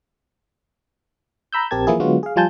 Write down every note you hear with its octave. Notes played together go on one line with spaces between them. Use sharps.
A#5 B5 E6 G6
A#1 C4 G4 A#4 A5 G#6
E3 F3 A#3 E4 G#4
D3 F#3 G#3 B3 F4 F#4
G#4 F5
F3 G3 F4 G#5 A5 G6